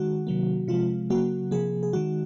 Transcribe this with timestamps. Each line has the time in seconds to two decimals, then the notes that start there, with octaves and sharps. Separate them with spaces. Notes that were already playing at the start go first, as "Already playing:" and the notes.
Already playing: D#3 G#3 F#4
0.27 C3 D#3 F#3 A#3
0.68 C3 F3 G#3 F4
1.10 C#3 F#3 A#3 F#4
1.51 C3 F3 A#3 G#4
1.83 G#4
1.93 D#3 G#3 F#4